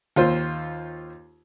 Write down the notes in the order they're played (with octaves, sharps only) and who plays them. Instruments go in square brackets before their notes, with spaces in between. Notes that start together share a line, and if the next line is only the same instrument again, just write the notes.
[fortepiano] D#2 F4 C5